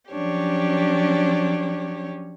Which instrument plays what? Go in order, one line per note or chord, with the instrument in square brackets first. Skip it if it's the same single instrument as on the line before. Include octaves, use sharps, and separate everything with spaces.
[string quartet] F3 F#3 C#4 D4 G4 C#5